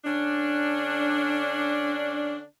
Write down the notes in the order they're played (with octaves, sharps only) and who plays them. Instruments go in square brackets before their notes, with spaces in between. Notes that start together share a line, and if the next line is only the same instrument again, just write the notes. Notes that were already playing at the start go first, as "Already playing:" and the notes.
[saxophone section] D3 C#4 D4